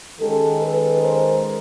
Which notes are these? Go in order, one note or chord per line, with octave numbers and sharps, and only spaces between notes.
D#3 G#3 C#4 G4 A4
A4 B4
A#4 C5